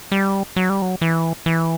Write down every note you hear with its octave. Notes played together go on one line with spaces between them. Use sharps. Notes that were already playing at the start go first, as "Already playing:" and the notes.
G3
F#3
G3
F#3
E3
E3